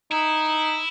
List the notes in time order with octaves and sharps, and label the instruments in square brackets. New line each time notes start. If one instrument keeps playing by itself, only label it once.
[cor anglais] D#4 [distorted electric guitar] E4